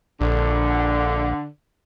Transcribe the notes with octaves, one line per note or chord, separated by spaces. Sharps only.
A#1 D3